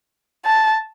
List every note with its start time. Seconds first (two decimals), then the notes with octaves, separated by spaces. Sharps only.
0.46 A5